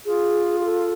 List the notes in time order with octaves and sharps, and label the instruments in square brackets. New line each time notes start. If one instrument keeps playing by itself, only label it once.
[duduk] F4 [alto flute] G#4
[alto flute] G#4
A4